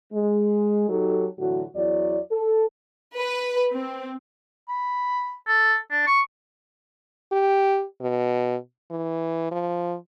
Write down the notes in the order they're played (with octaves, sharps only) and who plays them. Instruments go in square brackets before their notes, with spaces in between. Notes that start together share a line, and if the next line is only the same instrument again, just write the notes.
[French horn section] G#3
F#3 D#4 G4 A4
A2 D3 E3 F#3 F#4
E2 F#3 E4 D5
A4
[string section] B4
C4
[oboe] B5
A4
D4
C#6
[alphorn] G4
B2
E3
F3